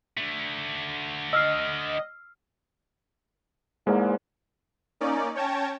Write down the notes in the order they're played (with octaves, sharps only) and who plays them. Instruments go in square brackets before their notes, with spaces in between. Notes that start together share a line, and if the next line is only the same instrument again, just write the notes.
[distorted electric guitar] D3 A3
[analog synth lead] D#5 [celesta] E6 F6 C7
[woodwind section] E2 G#2 [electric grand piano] G#3 A#3
[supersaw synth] A#3 C#4 D#4 D5
C#4 C#5 G5 A5 G#6 A#6